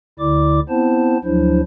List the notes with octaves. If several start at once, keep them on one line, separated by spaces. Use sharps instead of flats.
D2 D3 E4 D5 D6
B3 C4 E4 C5 A5
D2 F3 F#3 D4 E4 C5